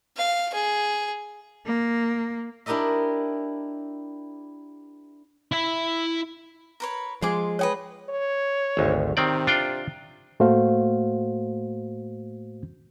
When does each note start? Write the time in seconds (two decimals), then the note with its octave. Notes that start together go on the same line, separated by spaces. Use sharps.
0.17 F5
0.54 G#4
1.65 A#3
2.66 D4 E4 G4 A#4 D#5 E5
5.52 E4 E5
6.80 A#4 B4 C#5
7.22 F3 G#3 F4 G#4 C6 D6
7.59 B4 C#5 D#5 G5 G#5
8.09 C#5
8.77 G#1 D2
9.17 C3 D#3 C4 D5
9.47 D4 F4 G5
10.40 A2 A3 A#3 F#4 C5 F5